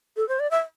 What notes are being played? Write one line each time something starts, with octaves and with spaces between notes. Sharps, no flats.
A4
C5
D5
E5